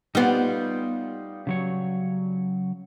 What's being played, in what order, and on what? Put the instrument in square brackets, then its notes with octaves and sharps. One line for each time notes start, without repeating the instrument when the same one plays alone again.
[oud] G3 B3 [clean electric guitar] D#4 F4
[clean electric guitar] C#3 F#3 C#5